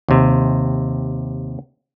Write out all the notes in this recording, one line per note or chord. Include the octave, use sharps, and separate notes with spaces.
D#2 C3